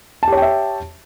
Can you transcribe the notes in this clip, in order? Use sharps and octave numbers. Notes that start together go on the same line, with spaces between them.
G4 C#5 E5 G5 A5